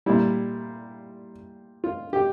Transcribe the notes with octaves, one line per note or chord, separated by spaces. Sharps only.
A#2 G3 E4
F4
G4